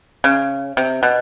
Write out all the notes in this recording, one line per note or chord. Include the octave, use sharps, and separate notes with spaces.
C#3
C3
B2